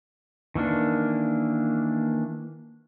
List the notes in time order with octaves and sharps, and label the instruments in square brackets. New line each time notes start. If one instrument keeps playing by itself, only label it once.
[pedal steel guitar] D#3 E3 A#3 D4